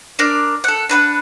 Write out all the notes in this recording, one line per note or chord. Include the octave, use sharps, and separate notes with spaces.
D4 A#4 D5
A4 F#5
D4 B4 F#5